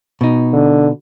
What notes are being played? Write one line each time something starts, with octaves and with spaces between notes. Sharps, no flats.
B2 D#4
D3